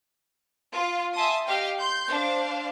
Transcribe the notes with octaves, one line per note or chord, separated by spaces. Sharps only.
F4
E5 G#5 A5 C6 D#6
G4 D#5 F5 G5
C6 G6
D4 C5 F5